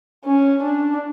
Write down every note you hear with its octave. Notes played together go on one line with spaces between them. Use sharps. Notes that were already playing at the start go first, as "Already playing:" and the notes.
C#4
D4